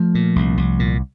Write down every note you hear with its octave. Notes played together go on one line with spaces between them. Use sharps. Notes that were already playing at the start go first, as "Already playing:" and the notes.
Already playing: F3 A3
A#2
C2
C2
A#2